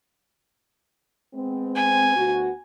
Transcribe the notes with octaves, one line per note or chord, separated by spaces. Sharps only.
G#3 B3 C4
G#5
D2 B3 F#4